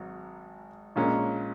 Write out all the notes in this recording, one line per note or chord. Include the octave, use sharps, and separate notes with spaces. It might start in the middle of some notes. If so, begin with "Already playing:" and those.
Already playing: G#1 G#2 F#3
A#1 A#2 G#3 C#4